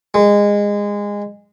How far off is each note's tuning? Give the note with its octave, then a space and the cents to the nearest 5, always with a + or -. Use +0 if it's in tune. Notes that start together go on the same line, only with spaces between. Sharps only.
G#3 -20